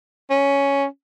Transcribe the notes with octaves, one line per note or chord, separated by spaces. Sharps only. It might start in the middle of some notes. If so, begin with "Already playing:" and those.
C#4